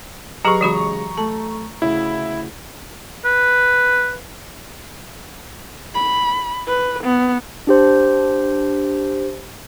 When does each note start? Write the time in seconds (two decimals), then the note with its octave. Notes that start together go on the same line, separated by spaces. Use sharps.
0.45 F#3 G4 G#4 B4 A#5 C#6 C7
0.61 C#3 E3 G#3 F#4 B5
1.18 A3 A5
1.82 D2 C#3 E4
3.25 B4
5.94 B5
6.67 B4
7.03 B3
7.67 D4 G4 C5